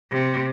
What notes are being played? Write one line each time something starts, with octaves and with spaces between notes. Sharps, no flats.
C3